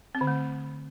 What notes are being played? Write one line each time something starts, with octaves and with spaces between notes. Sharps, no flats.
C4
D3
A3